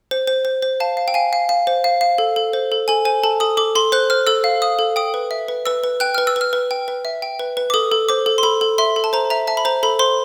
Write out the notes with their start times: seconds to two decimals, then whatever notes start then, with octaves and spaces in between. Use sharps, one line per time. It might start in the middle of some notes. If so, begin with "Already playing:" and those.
0.11 C5
0.27 C5
0.45 C5
0.62 C5
0.80 F5 A5
0.97 F5
1.08 G5
1.14 F5 G#5
1.33 F5
1.49 F5
1.67 C5
1.84 F5
2.01 F5
2.18 A4
2.36 A4
2.53 C5
2.72 A4
2.88 A4 G#5
3.05 C5 G#5
3.24 A4 A5
3.40 A4 D#6
3.57 A4 D6
3.75 A4 C6
3.92 C5 F#6
4.10 C5 F6
4.27 A4 E6
4.44 F5
4.62 F5 D#6
4.79 A4
4.96 G5 D#6
5.14 B4
5.31 E5
5.48 B4
5.66 B4 E6
5.84 B4
6.00 G5 F#6
6.15 B4 F6
6.27 E6
6.36 B4 F6
6.53 B4
6.71 G5
6.88 B4
7.05 E5
7.22 G5
7.39 B4
7.57 B4
7.70 D6
7.74 A4 D#6
7.92 A4
8.09 C5 D6
8.26 A4
8.38 C6
8.43 A4 B5
8.61 A4
8.78 E5 C6
8.96 A4
9.04 A5
9.13 C5 A#5
9.30 E5 A#5
9.47 E5 A5
9.57 B5
9.65 C5 A#5
9.83 A4 B5
9.99 C5 C6